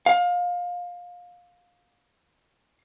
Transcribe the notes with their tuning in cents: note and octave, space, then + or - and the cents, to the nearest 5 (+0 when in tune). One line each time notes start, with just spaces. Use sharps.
F5 +25